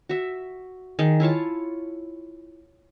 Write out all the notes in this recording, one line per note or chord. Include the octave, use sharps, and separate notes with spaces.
F#4 E5
D#3 G#4
E4 F4 C#5 A5